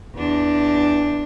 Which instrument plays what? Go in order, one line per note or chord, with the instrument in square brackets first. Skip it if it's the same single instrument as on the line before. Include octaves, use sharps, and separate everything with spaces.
[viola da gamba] E2 D4